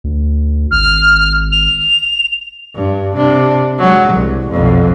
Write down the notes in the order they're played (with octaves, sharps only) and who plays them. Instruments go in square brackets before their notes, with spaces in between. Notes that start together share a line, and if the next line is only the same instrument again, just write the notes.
[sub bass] D2
[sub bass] G#1 [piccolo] F6
[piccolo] F7
[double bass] G2
C3 D4
F#3 G#3
C2
B1 F2